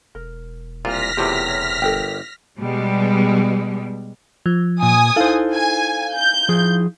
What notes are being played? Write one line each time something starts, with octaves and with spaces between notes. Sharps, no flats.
E1 A#4
C2 A#2 F4 F6 A#6 B6
E2 A2 C3 F4 G4
C#5
G1 A4 A#4 G5
B2 G3 G#3
F3
A#2 G#5 D#6
D#4 E4 A4 C5 F5
G#5
G6
F3 G#4